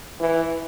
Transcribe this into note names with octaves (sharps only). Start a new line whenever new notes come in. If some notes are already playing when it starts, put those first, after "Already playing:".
E3